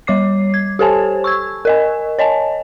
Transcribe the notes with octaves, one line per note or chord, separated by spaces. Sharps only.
G3 C#5 D6 C7
G#6
G4 A4 C5 C#5 G#5 A5
C#6 E6 G#6
A#4 D#5 G#5
C#5 D#5 G#5 A5